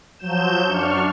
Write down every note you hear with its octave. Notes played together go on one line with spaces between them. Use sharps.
F3 F#3 G6 E7
F#2 D4 C#6 F6